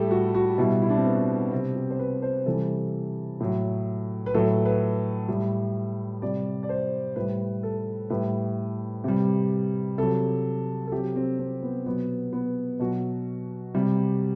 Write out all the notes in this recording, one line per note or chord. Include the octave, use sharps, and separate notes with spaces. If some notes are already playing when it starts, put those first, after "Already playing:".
Already playing: A2 G3 G4 A4
F#4
F#4
B2 G3 E4
E4
D4
C4
B3
C3 G3 C4
G4
C5
B4
C5
C3 E3 G3 A4
A2 F#3
B4
A2 F#3 A4
B4
A2 G3
C3 G3 D5
D5
C5
A2 G3 B4
A4
A2 G3 B4
C3 G3
C3 F#3 A4
A4
C3 F#3 G4
C4
C4
B3
B2 F#3 B3
B3
B2 F#3 F#4
C3 G3